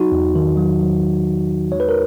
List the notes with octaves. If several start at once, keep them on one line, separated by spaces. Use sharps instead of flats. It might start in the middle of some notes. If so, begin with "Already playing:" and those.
Already playing: F#3 D#4 F#4
E2
D#3
F#3
F#3
E2
E2
E2
G#3 C#5
B4
A#4